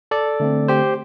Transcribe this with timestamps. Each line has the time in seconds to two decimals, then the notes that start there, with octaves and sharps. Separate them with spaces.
0.11 A4 D5
0.40 D3 A3 C4
0.68 G4 C5